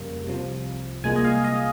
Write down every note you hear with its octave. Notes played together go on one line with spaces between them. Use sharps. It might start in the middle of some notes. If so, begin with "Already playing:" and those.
Already playing: F2 C#3 G3 A#3
C2 C3 F3
C2 A#2 G#3 G#5
D#5
F5
D#5